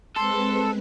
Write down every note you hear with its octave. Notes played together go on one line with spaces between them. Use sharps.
G#3 C4 A4 B4 C6